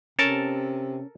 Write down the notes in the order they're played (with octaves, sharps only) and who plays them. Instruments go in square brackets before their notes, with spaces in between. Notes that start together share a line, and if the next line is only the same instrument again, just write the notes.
[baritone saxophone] C3 [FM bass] C#4 [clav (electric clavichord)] A4 A#4 A5